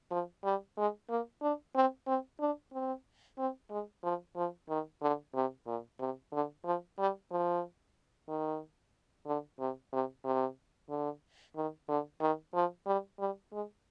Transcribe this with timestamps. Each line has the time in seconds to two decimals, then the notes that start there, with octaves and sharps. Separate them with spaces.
0.11 F3
0.44 G3
0.77 G#3
1.09 A#3
1.42 D4
1.75 C4
2.07 C4
2.40 D4
2.73 C4
3.38 C4
3.71 G#3
4.04 F3
4.36 F3
4.69 D#3
5.02 D3
5.35 C3
5.67 A#2
6.00 C3
6.33 D3
6.65 F3
6.99 G3
7.31 F3
8.29 D#3
9.26 D3
9.60 C3
9.93 C3
10.25 C3
10.90 D3
11.56 D#3
11.89 D3
12.21 D#3
12.54 F3
12.87 G3
13.19 G3
13.53 G#3